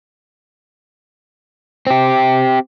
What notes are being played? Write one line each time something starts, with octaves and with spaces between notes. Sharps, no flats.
C4 G4